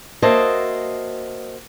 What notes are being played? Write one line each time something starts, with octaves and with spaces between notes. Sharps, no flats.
A#3 F#4 C5 D#5 E5 A5